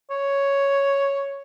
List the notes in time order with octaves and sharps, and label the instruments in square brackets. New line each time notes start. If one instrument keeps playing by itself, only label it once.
[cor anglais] C#5